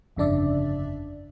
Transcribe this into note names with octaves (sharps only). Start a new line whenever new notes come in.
G1 F2 C#3 D4 D5 E5